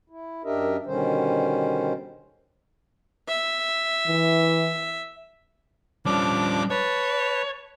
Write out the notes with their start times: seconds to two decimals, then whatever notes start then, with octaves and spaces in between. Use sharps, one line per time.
0.10 E4
0.44 F#2 D4 G4 A#4 D#5 E5
0.86 B2 D3 D#3 G3 C#4 C5
3.28 E5
4.07 E3
6.06 F3 G3 C#4 D4 D6
6.70 B4 C#5 A5